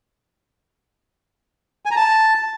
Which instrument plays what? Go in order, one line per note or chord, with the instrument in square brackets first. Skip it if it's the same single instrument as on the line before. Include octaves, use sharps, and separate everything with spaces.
[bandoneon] G#5
A#5
A5